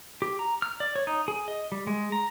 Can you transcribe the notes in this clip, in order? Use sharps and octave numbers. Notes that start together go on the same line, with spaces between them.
G4
A#5
F6
D5
C#5
D#4
G#4
D#5
G3
G#3
A#5